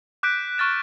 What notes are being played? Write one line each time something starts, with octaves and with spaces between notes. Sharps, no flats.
D6 F#6 G6 B6 D7
C#6 F6 A6 E7